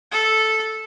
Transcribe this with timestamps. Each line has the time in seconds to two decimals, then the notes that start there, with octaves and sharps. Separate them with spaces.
0.12 A4